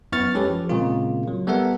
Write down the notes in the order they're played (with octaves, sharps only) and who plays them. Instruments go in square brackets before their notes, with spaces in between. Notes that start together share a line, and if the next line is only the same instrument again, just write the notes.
[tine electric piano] F#2 B3 E4 C#6 F6 A6
G#3 C#4 G4 A4 B4 C#5
F3
A#2 C#3 G#3 A#3 C4 F4
F#3
G3 B3 A4 A#4 E5 F#5